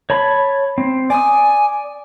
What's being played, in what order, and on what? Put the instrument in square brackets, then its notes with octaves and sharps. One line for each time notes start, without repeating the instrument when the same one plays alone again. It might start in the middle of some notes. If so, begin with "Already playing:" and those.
[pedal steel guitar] C#5 A5 B5
C4
[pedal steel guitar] D5 D#6 [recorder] G#5